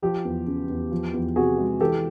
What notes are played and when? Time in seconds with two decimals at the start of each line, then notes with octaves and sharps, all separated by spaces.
0.02 F3 G4
0.25 E2
0.47 C#3
0.70 E2
0.91 F3
1.14 E2
1.36 C3 F#4 G#4
1.58 G#3
1.80 E3 G4 A4